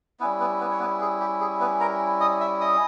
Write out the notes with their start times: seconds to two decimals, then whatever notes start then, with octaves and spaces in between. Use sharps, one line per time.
0.20 G3 B3 C#4 E4 B4
0.40 B3 B4
0.60 B3 B4
0.71 C#5
0.80 B3 B4
1.01 G#4
1.20 G4
1.41 G#4
1.60 B3 B4
1.80 A#4 A#5
2.20 D#5 D#6
2.41 E5 E6
2.61 D#5 D#6